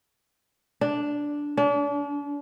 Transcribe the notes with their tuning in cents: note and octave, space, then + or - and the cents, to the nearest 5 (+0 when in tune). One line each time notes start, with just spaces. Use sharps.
D4 -5
D4 -40